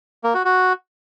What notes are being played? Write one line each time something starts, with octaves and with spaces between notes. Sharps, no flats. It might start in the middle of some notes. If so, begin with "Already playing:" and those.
A#3
F#4
F#4